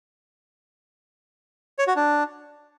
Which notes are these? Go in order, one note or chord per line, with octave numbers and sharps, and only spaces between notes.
C#5
F#4
D4